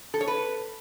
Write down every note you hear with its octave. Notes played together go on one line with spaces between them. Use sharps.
A4
C#5
B4